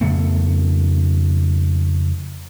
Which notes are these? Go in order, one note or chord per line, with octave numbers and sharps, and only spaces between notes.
F2 C#3 A3 B3